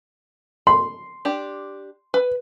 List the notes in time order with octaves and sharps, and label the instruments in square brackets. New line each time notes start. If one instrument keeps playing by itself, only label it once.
[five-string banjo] B5 [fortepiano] C6
[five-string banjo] D4 G4
B4